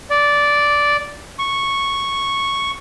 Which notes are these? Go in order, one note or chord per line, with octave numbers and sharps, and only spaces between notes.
D5
C#6